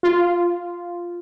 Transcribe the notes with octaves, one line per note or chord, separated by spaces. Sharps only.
F4